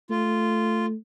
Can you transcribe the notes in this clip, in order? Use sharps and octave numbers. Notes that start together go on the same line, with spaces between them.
A3 F4